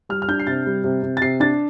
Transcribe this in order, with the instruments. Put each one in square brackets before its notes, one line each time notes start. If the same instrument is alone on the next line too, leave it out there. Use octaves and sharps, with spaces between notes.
[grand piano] G3 F6
F6
D4 G6
C7
C3 A6
G3
C3
C3
A6
C3 C7
D4 A6